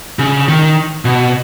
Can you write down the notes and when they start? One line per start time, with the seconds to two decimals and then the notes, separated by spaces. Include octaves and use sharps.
0.19 C#3
0.48 D#3
1.05 B2